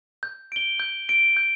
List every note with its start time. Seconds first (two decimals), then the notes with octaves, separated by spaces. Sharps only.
0.23 G6
0.52 D7 G7
0.80 G6
1.09 D7 G7
1.37 G6